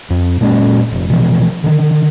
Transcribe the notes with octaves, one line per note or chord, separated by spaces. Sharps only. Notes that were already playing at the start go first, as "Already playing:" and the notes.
F2
A#2 G#3 C4 C#4
F1
B2 E3 F3
D3 D#3